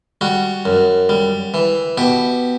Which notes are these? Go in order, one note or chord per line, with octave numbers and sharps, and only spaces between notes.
G3 F#4
F#2
G3
E3
B2 G4